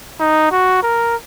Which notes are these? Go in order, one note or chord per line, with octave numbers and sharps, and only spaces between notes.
D#4
F#4
A#4